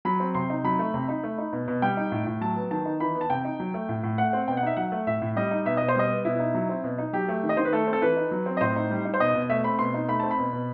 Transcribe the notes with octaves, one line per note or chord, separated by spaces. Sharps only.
F#3 B5
C4
C3 C6
D#4
F#3 B5
A3
C3
D#4
A3
D#4
B2
B2
G3 G5
D#4
A2
A2
F#3 A5
B3
D#3 A5
D#4
E3 B5
B3
A5
C3 G5
D#4
F#3
A3
A2
A2
A3 F#5
C4
B2 G5
F#5
D#4 E5
F#3 F#5
A3
A2 E5
A2
G3 D#5
D#4
B2 E5
B2 D#5
C5
G3 D#5
B3
B2 E4
D#4
F#3
C4
B2
D#4
F#3 G4
A3
D#3
D#5
D#3 C5
B4
A3 A4
C4
A4
E3 B4
D#4
F#3
C4
D#5
A2 C5
D#4
G3
D#4
C5
B2 D#5
B2
A3 E5
C4 B5
B2 C6
D#4
A3 B5
C4 A5
B5
B2
B2